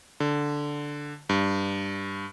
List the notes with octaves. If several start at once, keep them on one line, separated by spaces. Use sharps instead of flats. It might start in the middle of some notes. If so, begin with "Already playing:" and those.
D3
G2